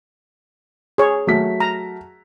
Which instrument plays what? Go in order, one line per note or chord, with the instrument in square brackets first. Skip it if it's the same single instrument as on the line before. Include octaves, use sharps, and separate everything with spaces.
[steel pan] G#4 C#5
[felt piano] F#3 A3 B6
[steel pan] A#5